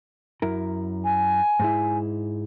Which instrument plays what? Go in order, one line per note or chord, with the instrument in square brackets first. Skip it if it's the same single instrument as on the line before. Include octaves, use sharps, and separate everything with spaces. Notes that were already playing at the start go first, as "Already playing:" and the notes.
[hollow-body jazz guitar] F#2 E4 A#4
[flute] G#5
[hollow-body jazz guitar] G#2 G#3 E4